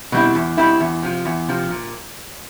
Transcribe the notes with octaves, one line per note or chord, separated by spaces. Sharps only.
B2 G3 C4 E4
E2
B2 G3 C4 E4
E2
C3 F3
E2
C3 F3
A#2